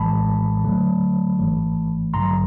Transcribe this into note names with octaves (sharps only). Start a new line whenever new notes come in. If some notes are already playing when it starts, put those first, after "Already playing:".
Already playing: A#1 A2 E3 G#3 A5 B5
D2 D3 F#3 A3
G#1 G#2 E3 A3
A1 G2 D3 F#3 A#5 C6